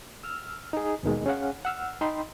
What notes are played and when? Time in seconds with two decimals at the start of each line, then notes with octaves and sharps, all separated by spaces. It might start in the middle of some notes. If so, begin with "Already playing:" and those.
0.23 E6 F6
0.73 D#4 G#4
1.03 D#2 B2 D#3 G#3
1.26 C#4 G#4 F5 F#5
1.65 F#5 E6 F6
2.01 D#4 G5 B5 C6